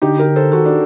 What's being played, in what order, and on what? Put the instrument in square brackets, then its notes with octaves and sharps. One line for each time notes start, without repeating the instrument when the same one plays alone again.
[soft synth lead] D3 [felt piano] D#4 G4
[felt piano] G4 A#4
A4 C5
[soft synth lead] D#3 [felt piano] F#4 A4
[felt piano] D4 F#4